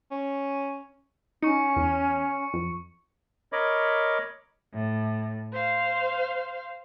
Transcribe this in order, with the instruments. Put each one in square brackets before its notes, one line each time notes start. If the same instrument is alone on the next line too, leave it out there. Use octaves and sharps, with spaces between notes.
[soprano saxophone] C#4
[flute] C#4 [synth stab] D#4 [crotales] C#6 C#7
[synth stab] E2
F2
[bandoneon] A#4 C#5 D#5 B5 D6
[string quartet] A2
C5 F5